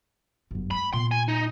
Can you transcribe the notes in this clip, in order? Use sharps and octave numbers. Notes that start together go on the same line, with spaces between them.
G1 F#2
G#3 B5
A#2 B3 C6
G#5
D#4